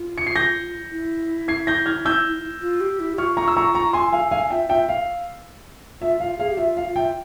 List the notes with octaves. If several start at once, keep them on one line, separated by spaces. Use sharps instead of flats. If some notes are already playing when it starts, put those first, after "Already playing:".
Already playing: F4
C#7
C7
G6 A#6
E4
G#6 C7
G6 A#6
F6 G#6
E6 G6
F4
G4
E4
G4
F4 C#6 F6
A#5 C#6
E6
A#5 C#6
A#5 C#6
G#5 C6
F5 G#5
F5 G#5
F4 E5 G5
F4 E5 G5
F5
F4 E5
F4 F5
G#4 F5
G4
F4 E5
F5
F4
E5 G5